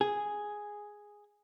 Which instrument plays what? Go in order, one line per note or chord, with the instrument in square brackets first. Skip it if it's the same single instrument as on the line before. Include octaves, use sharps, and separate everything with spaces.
[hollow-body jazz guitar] G#4